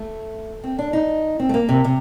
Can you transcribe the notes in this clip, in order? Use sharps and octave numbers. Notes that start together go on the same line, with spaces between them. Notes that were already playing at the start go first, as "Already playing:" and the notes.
Already playing: A3
C4
D4
D#4
C4
A3
A#3
C3
C3